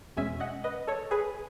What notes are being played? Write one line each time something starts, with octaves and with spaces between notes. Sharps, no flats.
E2 B2 G#3 C#4 E5 G#5
D#5 F#5
B4 D#5
A4 C#5
G#4 B4